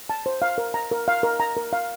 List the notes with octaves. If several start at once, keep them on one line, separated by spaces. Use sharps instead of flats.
A5
C5
F5
A#4
A#5
A#4
F5
A#4
A#5
A#4
F5